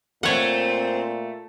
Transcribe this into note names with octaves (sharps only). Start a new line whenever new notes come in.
A#2 A3 C4 C#5 F#5